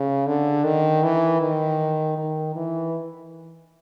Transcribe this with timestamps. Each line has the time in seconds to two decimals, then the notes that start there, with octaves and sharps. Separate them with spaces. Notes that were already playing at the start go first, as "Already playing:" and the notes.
Already playing: C#3
0.27 D3
0.64 D#3
1.03 E3
1.42 D#3
2.18 D#3
2.56 E3